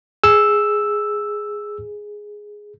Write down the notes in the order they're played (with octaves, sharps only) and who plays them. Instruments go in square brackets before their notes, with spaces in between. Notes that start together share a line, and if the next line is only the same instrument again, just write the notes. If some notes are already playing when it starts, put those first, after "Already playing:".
[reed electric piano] G#4 [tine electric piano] E6